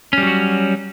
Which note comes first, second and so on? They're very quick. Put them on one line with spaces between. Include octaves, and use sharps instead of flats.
C#4 G3 F#3 F#4